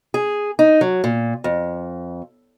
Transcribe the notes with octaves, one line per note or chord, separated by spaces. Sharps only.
G#4
D#4
F#3
A#2
F2